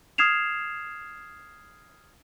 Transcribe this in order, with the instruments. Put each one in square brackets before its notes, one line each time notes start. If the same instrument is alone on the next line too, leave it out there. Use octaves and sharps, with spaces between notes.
[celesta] D#6 F6 G#6 C7 E7 F7